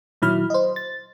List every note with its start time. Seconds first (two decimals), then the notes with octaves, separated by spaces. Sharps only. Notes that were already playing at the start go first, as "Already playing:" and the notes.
0.22 A#2 D#3 F#3 E4 B5 F6
0.50 C5 D#5
0.76 A6